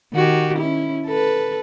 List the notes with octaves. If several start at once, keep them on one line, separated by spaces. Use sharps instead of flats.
D#3 F#4 G4
C#4 E4
A4 B4